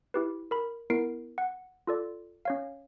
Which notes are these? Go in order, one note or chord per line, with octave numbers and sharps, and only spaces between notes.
E4 G4 B4
A#4 B5
B3 E4 A#4 C7 D7
F#5
F4 A4 D5
C#4 C#5 F5